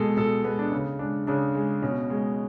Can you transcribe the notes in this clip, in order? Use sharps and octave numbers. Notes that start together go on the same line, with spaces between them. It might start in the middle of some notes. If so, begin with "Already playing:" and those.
Already playing: B2 G#3 A4
B2 A4
G#3 B3
D4
C#3
G#3 D4
C#3 D4
G#3
B2 C#4
G#3